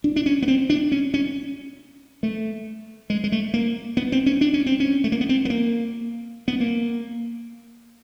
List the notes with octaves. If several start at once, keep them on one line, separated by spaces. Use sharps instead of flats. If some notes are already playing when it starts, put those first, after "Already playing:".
D4
D4
C#4
B3
C4
D4
C#4
C#4
A3
G#3
G#3
A3
A#3
B3
C4
C#4
D4
C#4
C4
C#4
A3
A#3
B3
C4
B3
A#3
B3
A#3